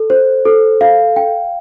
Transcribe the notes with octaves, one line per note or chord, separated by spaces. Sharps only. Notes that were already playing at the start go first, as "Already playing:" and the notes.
Already playing: A4
C5
A4
F5
G5